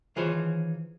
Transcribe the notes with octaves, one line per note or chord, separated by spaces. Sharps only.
D#3 E3 F4 G#4 C5 C#5